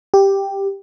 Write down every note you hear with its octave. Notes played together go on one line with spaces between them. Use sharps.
G4